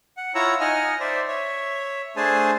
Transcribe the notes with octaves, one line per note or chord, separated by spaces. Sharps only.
F#5
E4 F4 C#5 F#5 A#5 E6
D#4 D#5 F#5 G#5 F6
C5 D5 E5
C#5 E5
A3 D4 G#4 C5 G#5 A5